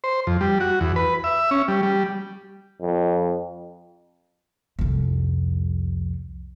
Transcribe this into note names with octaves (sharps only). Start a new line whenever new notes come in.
C5
F2
G3
F#4
E2
B4
E5
C#4
G3
G3
F2
C2 F2